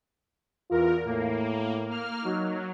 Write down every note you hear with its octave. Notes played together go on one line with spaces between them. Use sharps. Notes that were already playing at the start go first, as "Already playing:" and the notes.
E2 F4 A#4
A2 A#3
A#3 F6
F#3 D#4